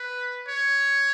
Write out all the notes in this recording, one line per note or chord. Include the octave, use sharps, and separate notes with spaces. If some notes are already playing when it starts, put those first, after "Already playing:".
Already playing: B4
C#5